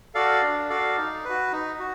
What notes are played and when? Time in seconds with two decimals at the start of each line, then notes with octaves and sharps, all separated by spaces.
0.15 F#4 A4 D5 F5
0.42 D4
0.69 F#4 A4 D5 F5
0.97 D#4
1.25 F#4 B4
1.52 D#4
1.80 F#4